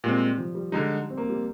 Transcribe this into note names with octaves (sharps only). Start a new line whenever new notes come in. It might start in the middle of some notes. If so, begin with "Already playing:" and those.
A#2 G3 G#3 C4
F3
G3
D3 G3 G#3 D#4
C4
A#3
G3